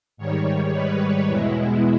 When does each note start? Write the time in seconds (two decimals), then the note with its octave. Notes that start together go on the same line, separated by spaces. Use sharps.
0.17 G#2 D#3 G3 C#5
0.73 B4
1.28 E2 B2 G#3 E4